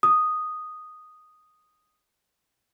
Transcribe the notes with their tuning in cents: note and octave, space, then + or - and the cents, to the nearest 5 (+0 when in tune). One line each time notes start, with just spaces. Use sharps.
D#6 -5